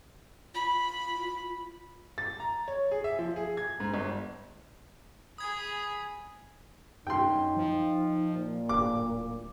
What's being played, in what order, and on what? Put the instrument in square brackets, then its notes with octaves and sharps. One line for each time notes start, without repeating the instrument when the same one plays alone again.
[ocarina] F4 [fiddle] B5
[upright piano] A6
A#5
C#5
G#4
E5
F3
G#4
G#6
G#2
G1
[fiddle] G#4 B5 [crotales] D#6 G#6
[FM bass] F#2 [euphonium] D#4 [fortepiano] G5 C6
[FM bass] F3
[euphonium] A#2
[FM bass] D1 [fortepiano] D6